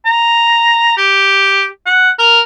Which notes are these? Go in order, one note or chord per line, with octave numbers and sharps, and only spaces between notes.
A#5
G4
F#5
A#4